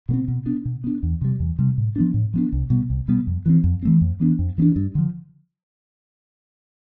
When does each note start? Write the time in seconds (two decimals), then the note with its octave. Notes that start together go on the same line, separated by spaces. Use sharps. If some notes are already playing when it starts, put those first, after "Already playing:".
0.09 B2 A3
0.13 C4
0.28 B2
0.46 B3 D4
0.65 B2
0.84 B3 D4
1.03 E2
1.21 C3 G3
1.40 E2
1.59 C3 G3
1.78 A2
1.96 F3 B3 D4
2.14 A2
2.34 F3 B3 D4
2.53 C2
2.70 B2 G3 B3
2.90 C2
3.08 B2 G3 B3
3.27 F2
3.46 E3 A3 C4
3.64 F2
3.83 E3 A3 C4
4.01 F2
4.20 E3 B3 D4
4.39 F2
4.58 E3 B3
4.62 D4
4.76 G2
4.95 D3 F3